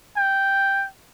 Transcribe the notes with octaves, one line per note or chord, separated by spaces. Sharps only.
G5